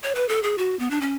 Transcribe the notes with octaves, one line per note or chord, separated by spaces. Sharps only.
C#5
B4
A4
G#4
F#4
B3
D4
C#4